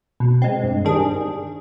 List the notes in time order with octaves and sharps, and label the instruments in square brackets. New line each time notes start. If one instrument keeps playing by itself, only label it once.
[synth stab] B2
G#3 C4
G2
D#3 G3 D4 G#4